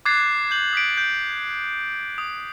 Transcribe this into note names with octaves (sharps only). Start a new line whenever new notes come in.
D6 F#6 G#6 A6 C7
D6 G6 F#7
D#6 B6 D7
G6
D#6